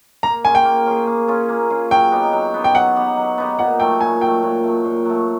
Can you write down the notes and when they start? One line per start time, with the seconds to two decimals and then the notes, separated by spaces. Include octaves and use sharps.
0.23 A#3 A#5
0.44 C#4 F4 G#4 G#5
0.55 G5
0.65 A#3
0.86 C#4 F4 G#4
1.07 A#3
1.28 C#4 F4 G#4
1.49 A#3
1.70 C#4 F4 G#4
1.91 F#3 G5
2.11 B3 D#4 G4
2.33 F#3
2.54 B3 D#4 G4
2.64 G5
2.74 F#3 F#5
2.96 B3 D#4 G4
3.17 F#3
3.38 B3 D#4 G4
3.59 A#2 F#5
3.80 F#3 A3 G5
4.00 A#2 G#5
4.21 F#3 A3 G5
4.43 A#2
4.63 F#3 A3
4.85 A#2
5.05 F#3 A3